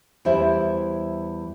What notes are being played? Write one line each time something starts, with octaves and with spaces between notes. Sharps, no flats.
E2 G3 E4 C5 E5